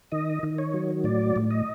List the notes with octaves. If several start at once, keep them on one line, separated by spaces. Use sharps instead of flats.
D#3 D#5
D#3
C#5
F#3
A2 D5
A2
D#5